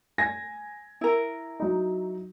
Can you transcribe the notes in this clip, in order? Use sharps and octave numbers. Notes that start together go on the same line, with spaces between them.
G#5 G#6 A#6
E4 A#4
F#3 D#4